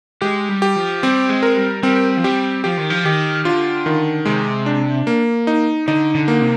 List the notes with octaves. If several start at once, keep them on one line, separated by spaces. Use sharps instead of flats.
G#3 G4
G3
G4
F3
G3 C4
G#3
A#4
G3
G3 C4
F3
G3 G4
F3 G4
D#3
F3
D#3 G4
D3 F4
D#3
C3 G#3
D4
A#3
D#4
D3 D#4
D3
A#3
C3